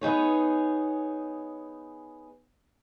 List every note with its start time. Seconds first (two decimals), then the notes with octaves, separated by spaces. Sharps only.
0.01 B3 D#4 G#4 C#5